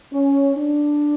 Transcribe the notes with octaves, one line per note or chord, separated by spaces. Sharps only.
C#4
D4